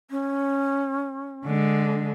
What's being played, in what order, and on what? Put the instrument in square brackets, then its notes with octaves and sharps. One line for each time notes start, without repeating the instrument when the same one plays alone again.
[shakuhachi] C#4
[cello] D3 G#3